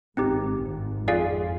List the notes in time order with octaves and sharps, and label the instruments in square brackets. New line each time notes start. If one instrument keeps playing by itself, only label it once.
[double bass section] G#1 G#2 [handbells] C4 D#4 G4
[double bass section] G#1 G#2
[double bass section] F2 [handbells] F4 G#4 D5 F5 G#5